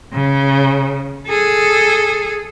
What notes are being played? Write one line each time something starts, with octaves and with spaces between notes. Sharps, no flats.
C#3
G#4 A4